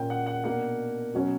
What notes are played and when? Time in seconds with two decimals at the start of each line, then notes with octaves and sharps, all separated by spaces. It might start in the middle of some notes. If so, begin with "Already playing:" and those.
Already playing: A#2 A#3 C#4 G5
0.10 F#5
0.26 F#5
0.44 B2 A#3 D4 F#5
1.14 B2 F#3 C#4